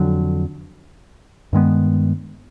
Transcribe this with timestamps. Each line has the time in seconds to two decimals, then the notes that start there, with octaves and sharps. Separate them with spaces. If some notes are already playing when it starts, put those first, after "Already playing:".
Already playing: F2 D3 F#3
1.53 G2 D#3 G#3 B3